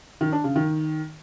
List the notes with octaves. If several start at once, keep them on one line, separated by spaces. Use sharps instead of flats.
D#3
D4
C#3
D#3